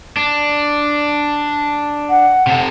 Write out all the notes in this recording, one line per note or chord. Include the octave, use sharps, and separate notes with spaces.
D4
F#5
C3 A4